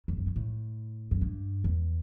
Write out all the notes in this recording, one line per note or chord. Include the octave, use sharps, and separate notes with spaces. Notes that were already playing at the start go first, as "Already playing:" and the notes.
E2
F#2
G2
A2
F#2
G2
E2